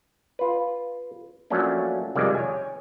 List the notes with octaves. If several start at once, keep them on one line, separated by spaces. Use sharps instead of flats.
F4 B4
F3 F#3 A3 A#3 C#4 D4
C2 F2 D#3 G3 G#3 D5
C#5 G#5